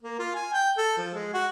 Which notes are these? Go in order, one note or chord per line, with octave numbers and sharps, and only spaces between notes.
A#3
F4
G#5
G5
A4
F3
G#3
F#4